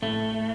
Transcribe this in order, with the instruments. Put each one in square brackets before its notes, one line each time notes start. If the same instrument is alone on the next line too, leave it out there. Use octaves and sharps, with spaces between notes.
[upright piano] A2 [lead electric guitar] A3